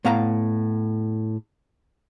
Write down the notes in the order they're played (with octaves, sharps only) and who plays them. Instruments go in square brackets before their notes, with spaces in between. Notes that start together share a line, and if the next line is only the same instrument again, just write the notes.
[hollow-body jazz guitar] A2 B3 F5 A#5